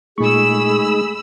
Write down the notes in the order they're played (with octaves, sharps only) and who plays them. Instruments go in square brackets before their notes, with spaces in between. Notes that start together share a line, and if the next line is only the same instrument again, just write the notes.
[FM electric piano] A#2 C#6 [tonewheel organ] G#3 A3 D#4 [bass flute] G#4 [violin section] B5 E6